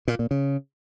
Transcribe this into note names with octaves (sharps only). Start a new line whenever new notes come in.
A#2
A#2
C#3